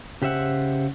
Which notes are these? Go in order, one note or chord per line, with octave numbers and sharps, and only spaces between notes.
C#3 G4 C5 E5 F#5